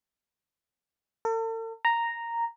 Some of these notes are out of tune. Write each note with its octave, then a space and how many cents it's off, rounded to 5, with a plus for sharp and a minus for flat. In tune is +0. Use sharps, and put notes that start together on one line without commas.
A4 +45
A#5 -5